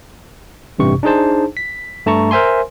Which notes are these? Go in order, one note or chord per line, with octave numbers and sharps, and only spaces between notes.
A1 G2 C3 C#6
D4 D#4 G#4 C5 A5
B6
G2 A3 A5 A#5 C#6
A#4 C5 E5 G#5 C6